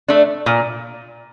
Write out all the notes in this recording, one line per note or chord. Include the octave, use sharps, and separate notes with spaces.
A3 D4
A#2